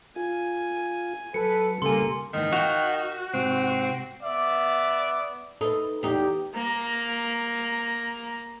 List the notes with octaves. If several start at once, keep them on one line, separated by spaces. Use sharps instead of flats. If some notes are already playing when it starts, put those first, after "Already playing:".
F4 G#5
F#3 A4 B4 C#7
C#3 G3 A#3 A4 G#5 C6
D#2 G#2 D#3 E3
F#4 F5 G5
G#2 C3 C4
B3 D5 E5
D#4 A4 B4
E2 D#4 G4
A#3 A#5